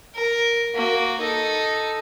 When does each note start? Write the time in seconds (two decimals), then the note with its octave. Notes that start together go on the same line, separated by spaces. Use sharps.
0.15 A#4
0.75 A#3 F#4
1.20 D#4 A4